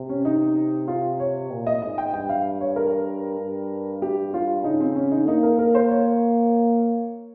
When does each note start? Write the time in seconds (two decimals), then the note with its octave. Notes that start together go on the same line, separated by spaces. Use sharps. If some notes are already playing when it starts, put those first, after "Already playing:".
Already playing: C3
0.09 C#4
0.25 D#4
0.88 F4
1.20 C#5
1.51 A#2
1.67 D#5
1.82 G#2 D#5
1.98 G5
2.13 G2 G5
2.29 F5
2.61 C#5
2.76 A#4
3.39 G2
4.02 G4
4.34 F4
4.64 C#3 D#4
4.80 C4
4.96 C#4
5.12 D#4
5.27 A#3 D#4
5.43 A#4
5.59 A#4
5.75 C5
5.90 C#5